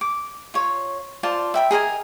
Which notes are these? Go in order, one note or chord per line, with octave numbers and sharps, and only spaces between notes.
D6
F4 C#5
F4 C5 D5 A5
E5 G5 B5
G#4 A#4 D#5 G#5